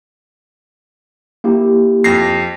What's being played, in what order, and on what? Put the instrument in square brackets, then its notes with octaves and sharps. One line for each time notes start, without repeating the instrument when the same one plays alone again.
[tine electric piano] A#3 E4 G4
[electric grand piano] F2 A#6 C7